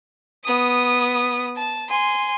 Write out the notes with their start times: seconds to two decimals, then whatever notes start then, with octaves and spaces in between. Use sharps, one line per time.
0.44 B3 D#6
1.56 A5
1.90 G#5 C6